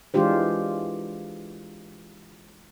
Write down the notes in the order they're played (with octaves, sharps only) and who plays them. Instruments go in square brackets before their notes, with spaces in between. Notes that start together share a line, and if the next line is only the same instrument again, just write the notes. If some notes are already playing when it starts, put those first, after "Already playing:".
[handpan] E3 G#3 D4 F4 G4 C5